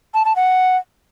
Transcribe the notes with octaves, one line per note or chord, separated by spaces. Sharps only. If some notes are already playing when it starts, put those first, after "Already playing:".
A5
A5
F#5